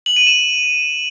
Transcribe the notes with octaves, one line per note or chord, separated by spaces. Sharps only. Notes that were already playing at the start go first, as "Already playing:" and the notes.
F#7
D#7
E7